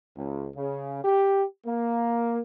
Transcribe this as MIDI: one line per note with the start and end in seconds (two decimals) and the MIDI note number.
0.16 0.48 37
0.55 1.00 49
1.04 1.43 67
1.65 2.40 58